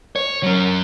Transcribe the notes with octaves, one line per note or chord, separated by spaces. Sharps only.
C#5
F#3 C#4